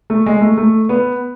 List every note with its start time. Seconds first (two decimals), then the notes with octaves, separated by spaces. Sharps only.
0.10 A3
0.26 G#3
0.41 A3
0.58 A3
0.89 B3